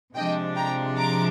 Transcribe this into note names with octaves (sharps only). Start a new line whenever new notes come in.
C3 F3 G#3 D4 D#5 G5
G5 A#5
A#5 D6